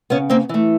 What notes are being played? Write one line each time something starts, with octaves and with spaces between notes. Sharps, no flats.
C#3 B3 C#4
A#3 C4
E3 A3